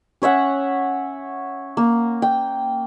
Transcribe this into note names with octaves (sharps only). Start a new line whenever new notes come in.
C#4 C#5 E5 F#5
A#3
G5